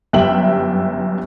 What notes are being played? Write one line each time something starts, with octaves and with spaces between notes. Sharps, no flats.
G1 F#2 G3 E5 G5 F#7